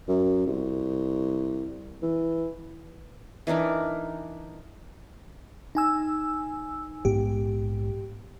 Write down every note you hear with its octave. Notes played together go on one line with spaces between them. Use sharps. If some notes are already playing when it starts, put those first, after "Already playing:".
F#2
C2
E3
E3 D4 D#4 A#4
D#4 G#5 E6
A#1 G#2 B3 G4